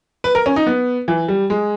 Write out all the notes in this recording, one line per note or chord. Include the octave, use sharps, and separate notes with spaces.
B4
A#4
C#4
D#4
B3
E3
G3
G#3